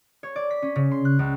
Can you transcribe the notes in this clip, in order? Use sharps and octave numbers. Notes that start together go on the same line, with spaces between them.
C#5
D5
B6
C#4
C#3
C6
F#6
C#2